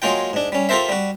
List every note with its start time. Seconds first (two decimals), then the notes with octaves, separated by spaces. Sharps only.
0.02 F#3 G#3 A#3 F4 G5
0.33 G#2 D4
0.52 G3 C#4
0.69 F4 G4 A4 A#4 C5 E5
0.89 G3 F#4